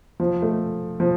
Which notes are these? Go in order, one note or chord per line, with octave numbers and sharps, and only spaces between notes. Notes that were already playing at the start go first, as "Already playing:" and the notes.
F3
A3
F3